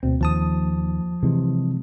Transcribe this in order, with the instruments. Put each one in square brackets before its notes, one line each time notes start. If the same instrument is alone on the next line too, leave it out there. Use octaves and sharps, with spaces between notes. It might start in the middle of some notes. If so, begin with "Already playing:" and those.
[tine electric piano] D2 B2 [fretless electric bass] C4
[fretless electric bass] D#2 [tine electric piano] F3 A5 D#6
[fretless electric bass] C3 E3 G#3